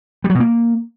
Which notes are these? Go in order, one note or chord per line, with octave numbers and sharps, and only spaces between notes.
G3
F#3
B2
A#3